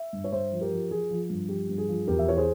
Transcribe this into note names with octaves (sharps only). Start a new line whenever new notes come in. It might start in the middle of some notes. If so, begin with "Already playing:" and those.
Already playing: E5
G2
C#5
G2 C5 E5
F3
G4 A#4
F3
F3 G#4
F3
G2
F3 G4
G2
G#4
F3
E2 G4 A#4
E5
E3 C#5
G#4 C5